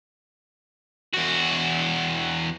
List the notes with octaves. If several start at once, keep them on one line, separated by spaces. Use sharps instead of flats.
E2 F#4